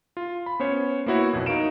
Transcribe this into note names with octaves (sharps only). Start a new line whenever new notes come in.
F4
B5
B3 C#4 C5 C#5
A#3 B3 E4 F#4 C#5
B1 F2 B2
D#4 F#4 A#4 F5 D7 E7